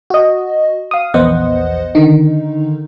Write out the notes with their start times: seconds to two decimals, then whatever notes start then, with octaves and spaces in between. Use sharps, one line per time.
0.10 F#4 D#5
0.91 F5 D#6
1.14 A#1 E2 B3 C5 D#5 F#5
1.95 D3 D#3 D#4